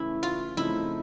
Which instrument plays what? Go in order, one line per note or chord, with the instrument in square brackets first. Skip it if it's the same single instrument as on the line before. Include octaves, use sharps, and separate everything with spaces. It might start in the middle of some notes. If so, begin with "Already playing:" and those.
Already playing: [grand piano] C#3 E3 A3 C#4 [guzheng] E4
[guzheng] F4
[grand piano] C#3 F3 A3 C4 D#4 [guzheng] E4